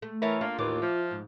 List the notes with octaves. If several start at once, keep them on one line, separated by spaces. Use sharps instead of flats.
A3
E3 E4 A#4 C#5 A5
A#3 D4 F4
D#2 A2 E3 A#3 D6
F3 E5
G#2